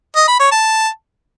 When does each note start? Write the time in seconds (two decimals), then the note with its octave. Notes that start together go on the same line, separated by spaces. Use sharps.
0.16 D#5
0.28 B5
0.39 C#5
0.51 A5